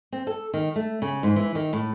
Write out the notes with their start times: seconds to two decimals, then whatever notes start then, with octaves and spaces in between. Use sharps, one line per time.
0.12 C4
0.27 A4
0.54 D#3
0.76 A3
1.02 C#3
1.23 G#2
1.36 E3
1.55 D#3
1.73 A2